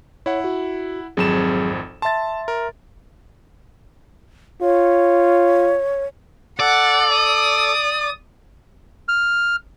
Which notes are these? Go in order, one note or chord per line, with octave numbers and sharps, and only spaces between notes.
E4 C#5 F#5
F#4
G#1 F2 F#3 C4 G#4 E7
E5 A5 C6 A6
A#4
F4 C#5
A4 D5 F#5
D#6
F6